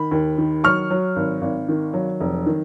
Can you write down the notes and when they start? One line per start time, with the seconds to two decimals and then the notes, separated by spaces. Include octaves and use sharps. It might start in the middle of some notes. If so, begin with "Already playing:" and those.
Already playing: D#3 B5
0.11 D#2
0.38 D#3
0.64 F#3 C#6 F6
0.90 F#3
1.16 G#1
1.42 G#1
1.69 D#3
1.93 F#3
2.20 F1
2.46 D#3